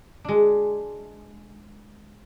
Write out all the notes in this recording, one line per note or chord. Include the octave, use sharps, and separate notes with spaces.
G#3 D4